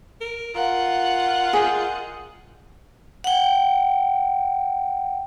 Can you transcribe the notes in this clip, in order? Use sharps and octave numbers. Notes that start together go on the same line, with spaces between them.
A#4
F4 A#4 F5 F#5 A#5
G#4 D#5 G5
F#5 G5